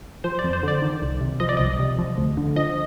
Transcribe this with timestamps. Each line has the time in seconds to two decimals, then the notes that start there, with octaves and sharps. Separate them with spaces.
0.24 F3 C5
0.39 D5
0.44 F2
0.53 C5
0.63 D3 D5
0.82 D#3
1.02 C2
1.21 C3
1.40 F3 D#5
1.49 D5
1.57 C2 D#5
1.79 C3
1.98 F3
2.18 D2
2.37 D3
2.56 F3 D#5